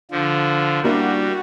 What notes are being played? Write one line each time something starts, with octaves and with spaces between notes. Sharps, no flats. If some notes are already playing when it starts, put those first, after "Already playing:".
D3 F3
G3 A#3 D4 E4 F#4